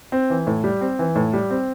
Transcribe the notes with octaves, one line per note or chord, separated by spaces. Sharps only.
C4
E3
A2
G3
C4
E3
A2
G3
C4